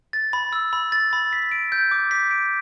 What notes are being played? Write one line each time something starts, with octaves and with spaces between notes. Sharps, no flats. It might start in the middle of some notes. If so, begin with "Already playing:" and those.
A6
B5
E6
B5
A6
B5
B6
D7
G6
D6
B6
D7